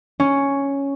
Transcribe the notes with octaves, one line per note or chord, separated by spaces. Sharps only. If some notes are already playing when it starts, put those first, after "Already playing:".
C#4